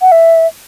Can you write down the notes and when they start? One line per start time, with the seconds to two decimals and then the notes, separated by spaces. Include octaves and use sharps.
0.01 F#5
0.12 E5